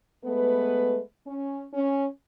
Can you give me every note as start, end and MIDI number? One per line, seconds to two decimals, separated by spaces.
0.25 0.99 56
0.25 0.99 57
0.25 0.99 59
0.25 0.99 71
1.27 1.66 61
1.74 2.06 61